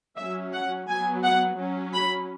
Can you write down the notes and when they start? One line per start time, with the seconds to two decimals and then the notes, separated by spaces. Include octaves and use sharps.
0.16 F#3 C#4 E5
0.53 F#5
0.87 F#3 B3 G#5
1.23 F#5
1.57 F#3 C#4
1.93 B5